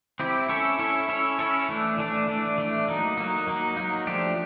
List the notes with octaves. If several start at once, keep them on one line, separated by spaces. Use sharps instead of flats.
C4 E4 G4
C#4 E4 A4 C#5
C#4 E4 A4 C#5
C#4 E4 A4 C#5
C#4 E4 A4 C#5
E3 A3 D4
E3 A3 D4
E3 A3 D4
E3 A3 D4
F#3 A#3 D#4
F#3 A#3 D#4
F#3 A#3 D#4
F#3 A#3 D#4
F3 A3 D4 G4